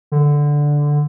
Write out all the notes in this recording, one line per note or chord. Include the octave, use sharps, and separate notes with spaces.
D3